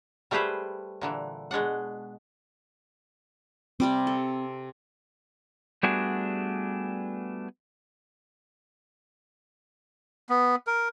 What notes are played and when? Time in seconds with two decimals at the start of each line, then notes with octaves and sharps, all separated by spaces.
0.31 G3 A3 G4 G#4 B4 C5
1.01 A#2 D3 E3
1.51 B2 G#3 D4 F#5
3.80 C3 G3 C4 D6
4.07 A4
5.83 G3 A3 B3 D4 F#4 G#4
10.29 B3
10.67 A#4